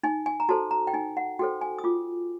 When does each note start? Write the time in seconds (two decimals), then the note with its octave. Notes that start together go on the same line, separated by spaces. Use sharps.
0.03 D#4 G#5
0.26 G#5
0.40 A#5
0.49 F#4 A4 C5 A5
0.71 A#5
0.87 G5
0.94 D#4 G#5
1.17 F#5
1.39 F#4 A4 C5 G5
1.61 G#5
1.78 D#6
1.84 F4 D6